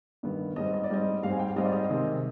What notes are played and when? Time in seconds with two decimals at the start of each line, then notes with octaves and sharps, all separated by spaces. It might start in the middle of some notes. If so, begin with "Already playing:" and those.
0.23 G2 D#3 B3
0.56 G#2 G3 C4 D#5
0.74 D#5
0.84 D5
0.90 G#2 G3 C4 D#5
1.23 G#2 G3 C4 F5
1.31 G#5
1.39 G5
1.48 F5
1.56 G#2 G3 C4 D#5
1.65 D5
1.72 D#5
1.90 C3 D#3 G#3 C4